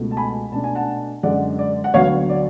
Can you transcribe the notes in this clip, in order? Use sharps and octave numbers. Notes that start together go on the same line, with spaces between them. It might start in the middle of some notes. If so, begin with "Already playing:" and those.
Already playing: C#2 B2 A3
A5
G#5 B5
B2 A3 D4 A5
G#5
F#5 A5
F#2 D3 G#3 D5 F#5
D5
F#5
D2 D3 F#3 B3 C#5 F5
D5